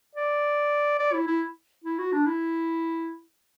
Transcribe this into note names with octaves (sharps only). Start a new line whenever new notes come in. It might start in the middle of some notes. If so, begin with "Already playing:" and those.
D5
D5
E4
E4
E4
F#4
D4
E4